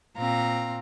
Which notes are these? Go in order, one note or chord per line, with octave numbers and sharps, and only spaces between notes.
A#2 C4 F5 A#5